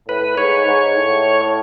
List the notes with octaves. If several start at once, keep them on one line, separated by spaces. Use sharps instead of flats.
A2 B4
G#2 C#5
G#2
A2